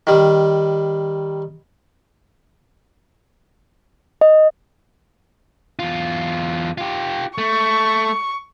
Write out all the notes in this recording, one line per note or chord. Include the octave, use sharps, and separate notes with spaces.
D#3 G3
D#5
E2 F4
F4 G4
A3 C#6